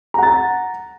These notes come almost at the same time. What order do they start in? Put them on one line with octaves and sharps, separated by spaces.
A#5 F#5 A6